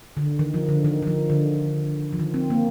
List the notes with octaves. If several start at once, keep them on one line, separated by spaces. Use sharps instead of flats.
D3
D#3
F3
D3
D#3
D#3
F3
D3
F3
D#3
C4
A#3